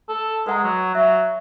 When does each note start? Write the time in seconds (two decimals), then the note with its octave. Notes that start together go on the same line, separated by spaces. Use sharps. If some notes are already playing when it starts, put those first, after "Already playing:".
0.09 A4
0.46 G#3 B4 F#5 A#5
0.63 F#3
0.95 F#3 E5